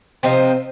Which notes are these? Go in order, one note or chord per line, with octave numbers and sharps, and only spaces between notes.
C3 F3 C4 D#4